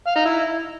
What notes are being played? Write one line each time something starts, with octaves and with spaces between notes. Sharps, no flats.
F5
D#4
E4